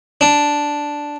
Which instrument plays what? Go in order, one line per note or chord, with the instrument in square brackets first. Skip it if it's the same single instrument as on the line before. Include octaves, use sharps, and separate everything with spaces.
[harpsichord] D4